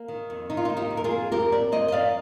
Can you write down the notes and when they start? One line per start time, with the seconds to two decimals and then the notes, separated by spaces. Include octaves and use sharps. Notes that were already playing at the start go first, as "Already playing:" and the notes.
Already playing: A#3
0.08 D#3
0.30 F2
0.50 D#3 D#4
0.57 F4
0.65 D#4
0.70 A#3
0.77 D#4 G4
0.90 F2
0.97 A#4
1.04 F4 G#4
1.11 A#3
1.32 F2 G4 A#4
1.52 A#3 A#4 D5
1.72 A#3 C5 D#5
1.88 D#5
1.92 F2 D5 F5